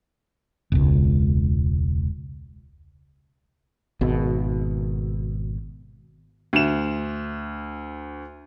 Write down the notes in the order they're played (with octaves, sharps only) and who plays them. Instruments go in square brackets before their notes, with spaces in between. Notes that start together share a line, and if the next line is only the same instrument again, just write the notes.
[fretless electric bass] E1 C#2
G#1 B2
[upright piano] D2 E7